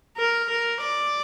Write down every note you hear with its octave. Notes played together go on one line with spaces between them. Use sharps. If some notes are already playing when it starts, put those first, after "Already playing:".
A#4
A#4
D5